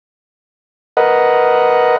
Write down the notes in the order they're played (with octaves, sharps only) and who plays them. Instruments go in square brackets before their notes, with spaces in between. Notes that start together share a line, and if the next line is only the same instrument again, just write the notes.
[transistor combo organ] A#4 B4 D#5 F#5